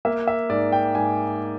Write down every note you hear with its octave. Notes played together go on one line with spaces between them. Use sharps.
A#3 E5
E5
G#2 D5
G5
G#2 G#5